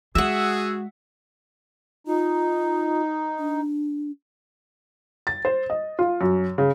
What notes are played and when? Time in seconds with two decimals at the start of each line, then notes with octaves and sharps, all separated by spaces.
0.15 G#3 F#4 G#4 E5 F#5 E6
2.07 D#4 F4
3.39 D4
5.27 A6
5.45 C5
5.70 D#5
5.99 F4
6.21 F#2
6.58 C#3